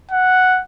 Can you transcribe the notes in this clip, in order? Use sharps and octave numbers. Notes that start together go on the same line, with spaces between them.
F#5